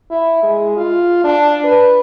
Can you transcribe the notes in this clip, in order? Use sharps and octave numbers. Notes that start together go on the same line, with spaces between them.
E4
G#3
F4
D4
B4